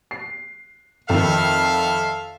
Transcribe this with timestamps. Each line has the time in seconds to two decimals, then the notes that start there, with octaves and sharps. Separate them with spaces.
0.11 C7
1.09 F2 D#3 A4 E5 F5